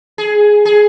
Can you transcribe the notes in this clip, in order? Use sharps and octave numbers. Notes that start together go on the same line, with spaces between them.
G#4
G#4